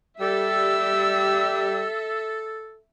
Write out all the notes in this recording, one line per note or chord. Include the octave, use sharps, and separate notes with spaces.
G3 G4 A4 E5 E6